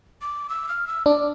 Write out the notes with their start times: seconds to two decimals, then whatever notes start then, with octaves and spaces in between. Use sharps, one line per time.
0.22 D6
0.49 E6
0.69 F6
0.87 E6
1.06 D4 D6